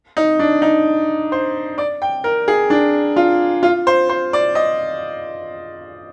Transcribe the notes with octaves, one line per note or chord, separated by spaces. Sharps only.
D#4
D4
D#4
C5
D5
G5
A#4
G#4
D4
F4
F4
C5
C5
D5
D#5